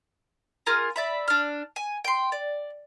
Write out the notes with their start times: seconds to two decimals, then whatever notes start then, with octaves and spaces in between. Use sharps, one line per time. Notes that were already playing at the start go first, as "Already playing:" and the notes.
0.66 F4 G#4 A#4
0.96 D5 E5 B5
1.28 D4 F6
1.76 G#5
2.05 G5 C6
2.32 D5